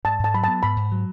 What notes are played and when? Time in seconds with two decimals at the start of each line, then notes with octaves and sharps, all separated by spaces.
0.05 G#2 A5
0.19 G#2 A5
0.34 F#3 B5
0.44 B3 A5
0.63 G#2 B5
0.76 G#2
0.92 F#3